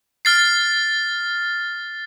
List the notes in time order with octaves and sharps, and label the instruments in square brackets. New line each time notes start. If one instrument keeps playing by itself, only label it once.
[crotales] F6 A6 C7